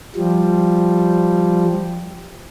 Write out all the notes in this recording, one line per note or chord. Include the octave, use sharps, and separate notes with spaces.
F3 G3